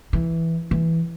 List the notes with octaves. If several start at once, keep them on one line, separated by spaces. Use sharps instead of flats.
E3
E3